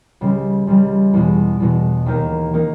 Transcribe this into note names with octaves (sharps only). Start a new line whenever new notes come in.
C#2 C#3 G3
C#2 C#3 G3
E2 B2 G#3
E2 B2 G#3
D#2 D#3 A#3 D#4
D#3 A#3 D#4